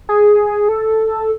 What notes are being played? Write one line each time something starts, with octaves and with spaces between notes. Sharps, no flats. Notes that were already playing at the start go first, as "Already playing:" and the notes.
G#4
A4